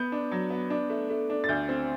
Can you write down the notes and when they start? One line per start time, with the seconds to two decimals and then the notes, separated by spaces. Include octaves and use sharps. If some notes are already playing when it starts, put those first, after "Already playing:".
Already playing: B3 G6
0.12 D4
0.32 F#3
0.50 B3
0.70 D4
0.90 A3
1.09 A3
1.30 D4
1.44 A6
1.49 D2 G6
1.69 C4